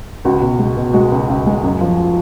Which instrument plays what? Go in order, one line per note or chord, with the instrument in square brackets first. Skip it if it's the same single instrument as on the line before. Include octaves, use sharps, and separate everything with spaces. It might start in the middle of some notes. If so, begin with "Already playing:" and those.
[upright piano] C#2 F#4
B2
G#3
B2
G#3 F#4
C#2
C#2
G#3
F#2
F3